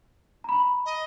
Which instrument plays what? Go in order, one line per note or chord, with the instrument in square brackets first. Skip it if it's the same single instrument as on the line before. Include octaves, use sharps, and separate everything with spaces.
[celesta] A#5 B5
[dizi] D#5